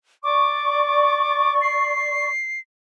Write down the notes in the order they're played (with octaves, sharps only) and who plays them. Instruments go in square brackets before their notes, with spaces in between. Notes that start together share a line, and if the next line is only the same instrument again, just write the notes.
[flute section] D5 C#6 [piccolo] D6
[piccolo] C7